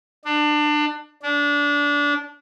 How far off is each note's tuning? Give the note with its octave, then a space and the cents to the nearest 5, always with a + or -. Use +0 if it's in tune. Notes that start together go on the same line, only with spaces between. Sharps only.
D4 +25
D4 -20